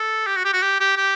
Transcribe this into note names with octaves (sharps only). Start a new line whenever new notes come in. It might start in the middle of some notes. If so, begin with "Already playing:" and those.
Already playing: A4
G4
F#4
G4
F#4
G4
G4
G4